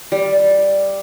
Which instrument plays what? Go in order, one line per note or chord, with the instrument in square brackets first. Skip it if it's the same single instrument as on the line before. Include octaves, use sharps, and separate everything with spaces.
[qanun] G3